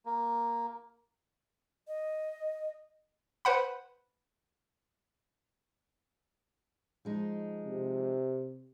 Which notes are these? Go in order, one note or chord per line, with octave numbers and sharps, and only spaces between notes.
A#3
D#5
B4 C5 F#5 B5
F3 G#3 D#4
C3